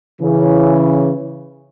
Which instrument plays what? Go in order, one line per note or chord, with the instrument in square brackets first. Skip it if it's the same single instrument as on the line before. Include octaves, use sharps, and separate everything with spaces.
[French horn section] C#3 E3